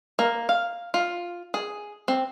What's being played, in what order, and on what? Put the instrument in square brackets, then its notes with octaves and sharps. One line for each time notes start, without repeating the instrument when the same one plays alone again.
[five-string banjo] A#3
F5
F4
G#4
C4